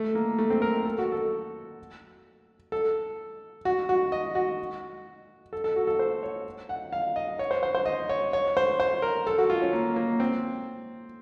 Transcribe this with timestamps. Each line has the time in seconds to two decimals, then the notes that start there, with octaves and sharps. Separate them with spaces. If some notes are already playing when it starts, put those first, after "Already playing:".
Already playing: A3
0.15 A#3
0.38 A3
0.50 C4
0.62 A#4
0.85 A4
0.98 F#4
1.12 A4
2.72 A4
3.65 F#4
3.89 F#4
4.12 D#5
4.35 F#4
5.53 A4
5.64 A4
5.76 F#4
5.87 A4
5.99 C5
6.23 C#5
6.69 F#5
6.93 F5
7.16 D#5
7.39 C#5
7.51 C5
7.63 C5
7.75 C5
7.86 D#5
8.09 C#5
8.33 C#5
8.57 C5
8.80 C5
9.02 A#4
9.27 A4
9.38 F#4
9.50 F4
9.62 C#4
9.73 A#3
9.96 A#3
10.20 C4